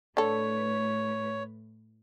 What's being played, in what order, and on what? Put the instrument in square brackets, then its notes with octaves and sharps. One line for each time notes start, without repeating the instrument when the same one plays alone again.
[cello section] A2 A3 B4 [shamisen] D3 A4 [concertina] C#5